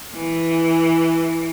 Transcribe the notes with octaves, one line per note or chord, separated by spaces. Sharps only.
E3